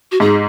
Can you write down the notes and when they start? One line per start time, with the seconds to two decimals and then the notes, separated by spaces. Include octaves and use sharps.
0.11 F#4
0.20 G#2 G#4